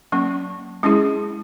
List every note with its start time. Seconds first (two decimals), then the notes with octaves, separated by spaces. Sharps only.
0.12 F#3 A#3 C#4
0.83 G#3 C#4 E4 G#4